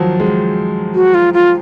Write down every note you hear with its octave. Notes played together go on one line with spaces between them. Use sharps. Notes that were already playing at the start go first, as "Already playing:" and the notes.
Already playing: D#3 F3 F#3
G#3
F#4
F4
F4